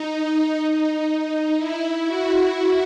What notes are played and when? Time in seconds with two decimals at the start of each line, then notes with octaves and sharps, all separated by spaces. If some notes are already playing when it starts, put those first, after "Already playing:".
Already playing: D#4
0.59 D#4
1.58 E4
2.06 F#4